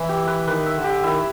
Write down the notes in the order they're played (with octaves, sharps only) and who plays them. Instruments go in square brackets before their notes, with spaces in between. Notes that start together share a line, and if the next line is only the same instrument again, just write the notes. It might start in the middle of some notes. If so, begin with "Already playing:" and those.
Already playing: [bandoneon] E3 [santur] E4 B4 E5
[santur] G4
B4
[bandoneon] D#3 [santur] B4
[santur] E5
[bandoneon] D3
[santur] G4
[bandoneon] D#3 [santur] E4